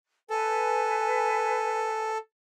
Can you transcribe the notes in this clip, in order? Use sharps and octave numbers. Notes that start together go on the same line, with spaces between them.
A4 B4 G#5